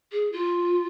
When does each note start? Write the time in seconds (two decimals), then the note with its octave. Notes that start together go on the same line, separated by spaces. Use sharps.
0.12 G#4
0.33 F4